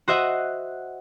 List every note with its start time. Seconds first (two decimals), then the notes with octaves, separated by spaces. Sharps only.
0.08 F#4 C5 D#5 E5 F#5